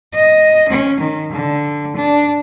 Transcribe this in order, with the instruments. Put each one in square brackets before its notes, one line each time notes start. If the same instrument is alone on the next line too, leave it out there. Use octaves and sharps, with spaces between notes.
[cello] D#5
C#4
D#3
D3
D4